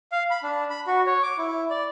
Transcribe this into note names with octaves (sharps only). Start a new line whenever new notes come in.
F5
B5
D4
B5
F#4
C#5
D6
E4
D5